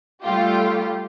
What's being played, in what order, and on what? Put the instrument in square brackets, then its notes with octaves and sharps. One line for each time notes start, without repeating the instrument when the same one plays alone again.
[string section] G3 A3 F4 G4